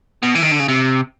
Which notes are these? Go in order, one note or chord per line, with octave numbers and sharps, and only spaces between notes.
B2
E3
D#3
D3
C#3
C3